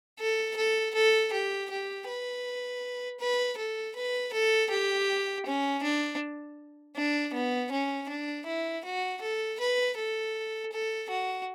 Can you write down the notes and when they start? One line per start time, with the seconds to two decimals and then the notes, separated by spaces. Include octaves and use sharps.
0.20 A4
0.57 A4
0.95 A4
1.32 G4
1.71 G4
2.07 B4
3.20 B4
3.57 A4
3.96 B4
4.33 A4
4.71 G4
5.46 C#4
5.83 D4
6.96 D4
7.34 B3
7.72 C#4
8.09 D4
8.47 E4
8.84 F#4
9.22 A4
9.60 B4
9.97 A4
10.73 A4
11.10 F#4